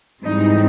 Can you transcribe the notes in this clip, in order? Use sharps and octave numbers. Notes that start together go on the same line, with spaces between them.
G#2 E3 G3 C4 D#4